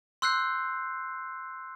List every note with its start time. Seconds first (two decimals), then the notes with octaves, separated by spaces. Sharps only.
0.22 C6 E6 F#6 G6 C7